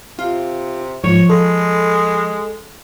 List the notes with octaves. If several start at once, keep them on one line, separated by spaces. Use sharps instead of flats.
C3 F4
G#2 F3 C#5
F3 G#3 A4